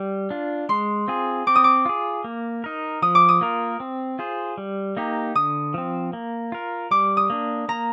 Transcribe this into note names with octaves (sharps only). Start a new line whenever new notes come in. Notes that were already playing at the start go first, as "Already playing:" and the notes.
Already playing: G3
D4 F4
G#3 C6
C4 F4 G#4
C4 D6
D#6
D6
F4 G#4
A#3
D#4 A#4
F3 D#6
D6
D#6
A#3 F4 A#4
C4
F4 G#4 C5
G3
A#3 D#4 G4
D3 D#6
F3 C4
A#3
F4 A#4
G3 D6
D#6
A#3 D4
A#3 A#5